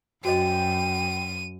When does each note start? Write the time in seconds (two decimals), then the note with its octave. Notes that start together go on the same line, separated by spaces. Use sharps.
0.25 F#2 F#4 C5 D#5 G5 D#7